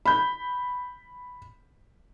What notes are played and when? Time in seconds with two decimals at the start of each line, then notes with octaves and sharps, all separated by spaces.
0.05 B5 G6